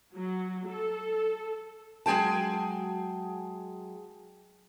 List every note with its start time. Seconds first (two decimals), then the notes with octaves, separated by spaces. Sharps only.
0.15 F#3
0.67 A4
2.06 F#3 G#3 G#4 G5 A5